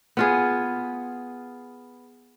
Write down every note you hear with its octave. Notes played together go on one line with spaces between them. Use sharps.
B3 F4 G#4